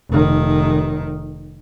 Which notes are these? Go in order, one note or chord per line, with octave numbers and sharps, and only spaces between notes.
F1 D#3